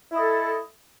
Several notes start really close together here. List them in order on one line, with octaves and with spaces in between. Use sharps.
E4 D#5 A4